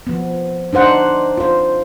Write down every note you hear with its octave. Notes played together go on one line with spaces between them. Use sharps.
F3 B3
D4 D#4 C5 F#5
F4 C5